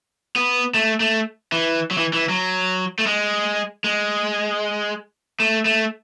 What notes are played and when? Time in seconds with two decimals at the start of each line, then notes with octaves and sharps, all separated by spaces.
0.36 B3
0.74 A3
1.00 A3
1.52 E3
1.91 F#3
1.98 E3
2.13 E3
2.29 F#3
2.99 A3
3.06 G#3
3.84 G#3
5.40 A3
5.65 A3